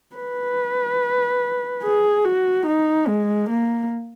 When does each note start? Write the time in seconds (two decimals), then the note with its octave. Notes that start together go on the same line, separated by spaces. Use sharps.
0.16 B4
1.83 G#4
2.25 F#4
2.66 D#4
3.08 G#3
3.50 A#3